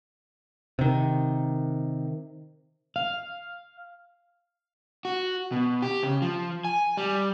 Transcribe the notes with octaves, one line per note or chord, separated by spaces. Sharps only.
C3 D#3
F5
F#4
B2
G4
C#3
F3
G#5
G3